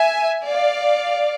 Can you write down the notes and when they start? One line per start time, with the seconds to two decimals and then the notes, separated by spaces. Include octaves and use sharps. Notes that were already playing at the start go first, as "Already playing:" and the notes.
Already playing: E5 G#5
0.46 D5 F5